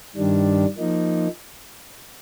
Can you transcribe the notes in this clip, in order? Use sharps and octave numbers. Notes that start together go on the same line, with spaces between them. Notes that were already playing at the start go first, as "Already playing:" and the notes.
G2 D#3 G3 D4
F3 A#3 D#4